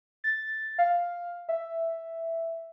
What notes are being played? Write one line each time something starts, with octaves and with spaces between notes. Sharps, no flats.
A6
F5
E5